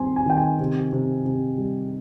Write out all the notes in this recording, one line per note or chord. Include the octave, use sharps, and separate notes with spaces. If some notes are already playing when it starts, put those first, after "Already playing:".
Already playing: D#3 G3 C4 G#5 C6
G#5
D#3 G5
G#5
C3
C3
C3
G3